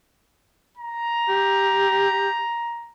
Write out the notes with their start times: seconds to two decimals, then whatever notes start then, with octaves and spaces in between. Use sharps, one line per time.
0.78 A#5
1.29 G4